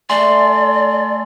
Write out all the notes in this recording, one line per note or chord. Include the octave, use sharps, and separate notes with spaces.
A3 A4 D5 G#5 C6